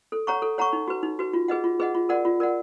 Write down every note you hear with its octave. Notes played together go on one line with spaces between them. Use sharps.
A4
C#5 F#5 A#5 C#6
A4
C#5 F#5 A#5 C#6
D#4
F#4 B4
D#4
F#4 B4
F4
G#4 B4 D#5 F#5
F4
G#4 B4 D#5 F#5
F4
A#4 D5 F#5
F4
A#4 D5 F#5